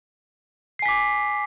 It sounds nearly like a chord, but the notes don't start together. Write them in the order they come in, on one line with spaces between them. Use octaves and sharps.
C7 G#5 B6 D6